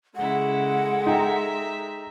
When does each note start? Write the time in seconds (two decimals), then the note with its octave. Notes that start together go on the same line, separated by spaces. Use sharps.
0.16 C#3 G#3 E4 A4 F#5
1.06 D#4 E5 G5 A#5